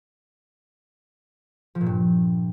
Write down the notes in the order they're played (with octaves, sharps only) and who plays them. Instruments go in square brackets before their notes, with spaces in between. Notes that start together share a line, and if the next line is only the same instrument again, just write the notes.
[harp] F3
A#2
G2